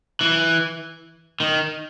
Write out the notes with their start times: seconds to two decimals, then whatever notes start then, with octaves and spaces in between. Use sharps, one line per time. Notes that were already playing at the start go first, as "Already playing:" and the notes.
0.21 E3
1.40 D#3